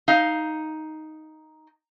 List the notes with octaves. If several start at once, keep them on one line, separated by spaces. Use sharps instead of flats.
D#4 F5